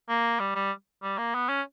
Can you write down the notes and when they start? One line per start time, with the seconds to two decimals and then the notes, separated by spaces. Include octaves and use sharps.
0.09 A#3
0.40 G3
0.55 G3
1.03 G3
1.18 A#3
1.34 B3
1.49 C#4